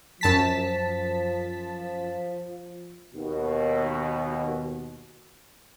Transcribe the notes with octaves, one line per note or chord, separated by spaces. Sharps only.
F#2 F3 A5 B6
D#2 B2